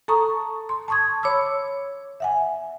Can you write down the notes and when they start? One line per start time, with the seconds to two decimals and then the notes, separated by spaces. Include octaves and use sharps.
0.08 A4 A5 A#5 C#6 D#6
0.69 C6
0.88 A5 C6 C#6 D#6 G#6
1.23 C#5 B5 D6 E6
2.20 E5 F#5 G#5